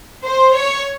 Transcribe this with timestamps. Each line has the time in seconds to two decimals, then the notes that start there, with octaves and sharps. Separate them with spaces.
0.25 C5
0.56 C#5